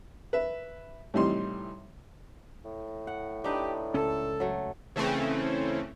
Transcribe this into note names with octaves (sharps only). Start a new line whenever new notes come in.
B4 E5
A2 C3 E3 G3 D#4 C6
A2
F#5
D4 D#4 G4 B4
C#2 C#4 A4
F#3 A3
C#3 E3 A3 C4 C#4